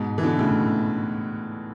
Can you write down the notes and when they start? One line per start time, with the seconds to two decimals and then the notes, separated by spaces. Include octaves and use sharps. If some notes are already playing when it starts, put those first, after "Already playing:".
Already playing: G#2 B2
0.18 E3
0.23 B2 D3
0.39 A2 C#3